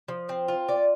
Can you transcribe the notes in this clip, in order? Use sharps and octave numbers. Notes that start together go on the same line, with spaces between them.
F3
C4
F4
D5